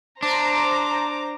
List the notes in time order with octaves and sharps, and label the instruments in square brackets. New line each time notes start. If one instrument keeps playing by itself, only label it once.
[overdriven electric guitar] D4 [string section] C5 A#5 D6